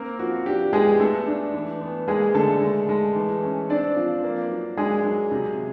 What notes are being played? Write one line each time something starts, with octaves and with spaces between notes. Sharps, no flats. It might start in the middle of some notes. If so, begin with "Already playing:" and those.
Already playing: A#3 C4 A#4
F3 F#4
D4 G4
G#3 B3 G#4
A3 B3 A4
D4
E3
B3
G#3 A#3 G#4
D3 A3 A4
G#3
G#3
E3
C#4
C4 D4 D5
F3
A#3
F#3
G#3 D4 G#4
F#3
C3